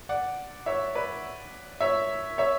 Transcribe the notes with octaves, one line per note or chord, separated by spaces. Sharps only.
D5 F#5
C#5 E5
B4 D5
C#5 E5
C#5 E5